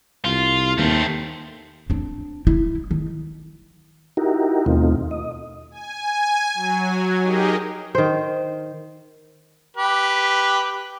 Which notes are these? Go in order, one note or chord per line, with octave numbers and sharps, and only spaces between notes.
C2 F4
D#2 A3 C4
C4 D4
E4
D#3
D#4 E4 F#4 G4 A#4
D#2 B2 A3 C4 D#4 F4
D#5
G#5
F#3
D#4 G4 G#4 A#4 D#5
D#3 C5
G4 B4